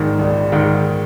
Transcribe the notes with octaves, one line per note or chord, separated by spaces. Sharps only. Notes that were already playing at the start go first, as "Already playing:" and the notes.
Already playing: A#1 G#2 D#3
A#1
G#2 D#3